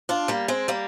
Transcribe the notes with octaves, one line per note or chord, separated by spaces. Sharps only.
D4 F4
G3 A#3
G#3 C4
G3 A#3